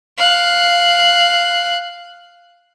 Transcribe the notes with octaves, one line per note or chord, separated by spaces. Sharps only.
F5 F#6